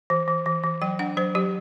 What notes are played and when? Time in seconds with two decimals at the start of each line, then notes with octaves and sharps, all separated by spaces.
0.10 E3
0.28 E3
0.46 E3
0.63 E3
0.82 F#3 G5
0.99 D4 F#5
1.17 F#3 C5
1.35 F#3 G4